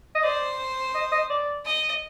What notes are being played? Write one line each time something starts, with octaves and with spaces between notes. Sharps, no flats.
D#5
C5 D5
D#5
D#5
D5
D#5